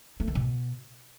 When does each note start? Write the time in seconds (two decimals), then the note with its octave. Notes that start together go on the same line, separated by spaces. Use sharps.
0.20 A3
0.28 D#3
0.35 B2